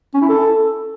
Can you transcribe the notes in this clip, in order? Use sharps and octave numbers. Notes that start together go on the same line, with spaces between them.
C#4
E4
A4